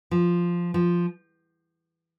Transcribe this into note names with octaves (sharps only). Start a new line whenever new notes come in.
F3
F3